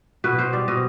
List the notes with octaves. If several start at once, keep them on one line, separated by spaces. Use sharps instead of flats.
B2 B4
B2 C5
G3 D5
B2 D#5